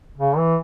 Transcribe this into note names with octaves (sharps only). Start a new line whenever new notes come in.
C#3
E3